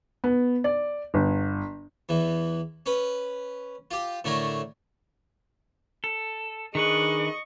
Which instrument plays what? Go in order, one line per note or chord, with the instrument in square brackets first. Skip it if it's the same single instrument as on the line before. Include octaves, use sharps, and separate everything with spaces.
[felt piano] B3
D5
G1
[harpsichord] E2 E3
C#4 B4
F4 G4
A2 D3 A3 A#4 C#5 A#5
[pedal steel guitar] A4
[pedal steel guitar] D#3 D4 B4 [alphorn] G#4 [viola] D#5 C#6